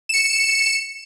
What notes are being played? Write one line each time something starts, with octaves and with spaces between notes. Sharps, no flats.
C#7 E7